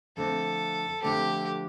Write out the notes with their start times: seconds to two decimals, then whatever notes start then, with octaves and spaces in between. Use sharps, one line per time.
0.17 F2 D3 A3 C4 A4
1.02 F2 D3 A3 C4 G4